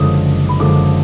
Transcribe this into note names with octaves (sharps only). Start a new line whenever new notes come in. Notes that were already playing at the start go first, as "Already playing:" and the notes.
Already playing: F#1 F#2 D3 F3 G#3 D6 D#6
F#1
B5
F#2 D3 F3 G#3 D6